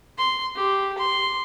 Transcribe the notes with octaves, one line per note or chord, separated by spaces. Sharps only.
C6
G4
C6